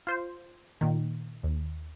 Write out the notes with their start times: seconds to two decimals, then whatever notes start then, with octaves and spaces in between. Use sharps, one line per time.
0.07 F4 C5
0.81 A#2 D#3
1.43 D#2